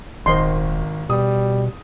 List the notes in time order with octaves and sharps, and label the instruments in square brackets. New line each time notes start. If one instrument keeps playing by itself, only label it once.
[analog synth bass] D#1 [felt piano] G#1 D#3 [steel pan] C5 D#5 C6
[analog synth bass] B2 [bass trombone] G3 [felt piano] D#6